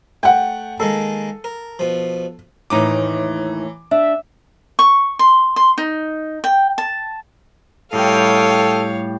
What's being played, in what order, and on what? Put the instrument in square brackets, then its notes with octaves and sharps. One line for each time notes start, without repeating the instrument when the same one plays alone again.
[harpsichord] A3 [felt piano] F#5 G5
[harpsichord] D#3 G#3 A#3 [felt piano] A4
[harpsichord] A#4
B2 F3
[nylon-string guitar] D#2 A2 D#4 [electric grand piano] E3 A#5 D6
[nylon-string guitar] D4 [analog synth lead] E5
[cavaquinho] C#6
C6
C6
D#4
G5
A5
[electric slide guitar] A2 G3 [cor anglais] A4 [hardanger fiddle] C#5 F5 [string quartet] G5 D#6 F6